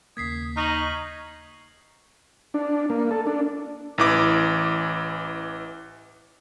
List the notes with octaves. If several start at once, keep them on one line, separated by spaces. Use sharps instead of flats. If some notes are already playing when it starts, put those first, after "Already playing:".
D#2 C#3 A#3 D#6 G#6 B6 C7
D#4 C#6 F6 A#6 F#7
D4
A#3
A4
D4
A1 E3 D6